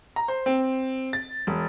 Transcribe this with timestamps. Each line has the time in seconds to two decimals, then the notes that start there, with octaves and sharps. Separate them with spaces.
0.16 A#5
0.28 C5
0.46 C4
1.13 A6
1.47 E1